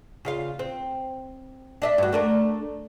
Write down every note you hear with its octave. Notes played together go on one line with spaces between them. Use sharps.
C#3 F4 F5
C4
D4 D#5 E5
G2 F#4
A3 D4 A#4